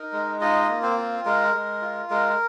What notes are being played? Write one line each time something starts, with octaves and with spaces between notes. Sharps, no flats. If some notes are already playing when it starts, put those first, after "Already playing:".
Already playing: D#4 A#4
G#3
D#4 F4 D#5
A#3
C4 C5
F4
G#3 A#4
G#3
F4
G#3 A#4